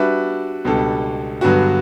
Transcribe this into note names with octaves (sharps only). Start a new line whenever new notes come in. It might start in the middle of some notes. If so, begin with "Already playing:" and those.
Already playing: G3 D4 F#4 B4 E5
C#2 B2 G3 D4 A4
G2 D3 F#3 B3 F#4